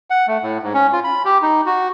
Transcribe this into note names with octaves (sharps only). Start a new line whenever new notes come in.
F#5
A3
A2
G#2
C#4
F4
B5
G4
D#4
F#4